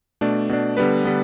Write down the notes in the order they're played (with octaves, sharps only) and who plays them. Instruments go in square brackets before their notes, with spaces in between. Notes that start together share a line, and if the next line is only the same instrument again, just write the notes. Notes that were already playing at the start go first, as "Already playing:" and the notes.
[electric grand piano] B2 A3 D4 D5
B2 A3 D4
D3 G3 B3 B4
D3 G3 B3